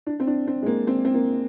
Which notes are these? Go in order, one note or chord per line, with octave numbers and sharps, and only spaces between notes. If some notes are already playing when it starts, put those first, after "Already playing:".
D4
C4
D4
C4
G#3
A#3
C4
C4
A#3